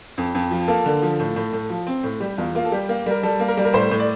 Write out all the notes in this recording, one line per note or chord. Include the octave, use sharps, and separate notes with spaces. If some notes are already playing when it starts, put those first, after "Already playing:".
F2
F2
F3
A#3 A4
D3
F3
A2
A2
A2
F3
C4
A2
G3 G4
E2 F4
A#3 F4
A4
G3 G4
A#3
G3 A#4
G3 A4
A#3
A#4
G3
A#4
A2 C5
A2
D5